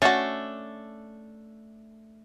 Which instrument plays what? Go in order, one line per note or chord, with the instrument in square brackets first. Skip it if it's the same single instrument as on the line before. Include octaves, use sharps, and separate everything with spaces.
[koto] A3 D4 A4 [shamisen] C#4 F#4